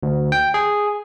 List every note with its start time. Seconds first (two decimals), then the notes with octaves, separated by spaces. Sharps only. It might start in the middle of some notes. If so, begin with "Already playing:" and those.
0.03 D2
0.32 G5
0.54 G#4